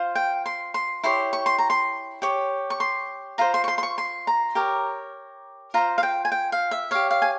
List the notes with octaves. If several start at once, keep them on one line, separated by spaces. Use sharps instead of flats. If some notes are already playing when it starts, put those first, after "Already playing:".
Already playing: F4 C5
G5
C6
C6
E4 G4 C#5 C6
C#6
C6
A#5
C6
G4 C#5
C#6
C6
F4 C5 A#5
C6
C#6
C6
C6
C#6
C6
A#5
G4 A#4 C#5
F4 C5 A#5
F5
G5
G#5
G5
F5
E5
G4 C#5 F5
F5
G#5